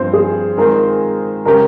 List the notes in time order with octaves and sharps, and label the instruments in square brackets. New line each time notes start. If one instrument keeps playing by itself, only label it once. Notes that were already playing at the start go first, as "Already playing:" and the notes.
Already playing: [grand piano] G2 F3 C4 [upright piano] C5
[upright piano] G#4
[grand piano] D#3 G#3 C4 F4 C5 [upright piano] A#4
[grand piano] C#3 G#3 C#4 G4 [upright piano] A#4